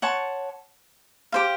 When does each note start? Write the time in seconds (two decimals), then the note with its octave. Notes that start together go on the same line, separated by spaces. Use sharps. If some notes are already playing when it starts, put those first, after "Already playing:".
0.02 C#5 F#5 A5 C6
1.32 G4 C5 F5